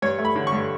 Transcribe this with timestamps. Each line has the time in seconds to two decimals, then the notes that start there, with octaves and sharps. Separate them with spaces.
0.02 G2 C#5
0.19 A3
0.25 B5
0.36 D3
0.47 C#6
0.52 G2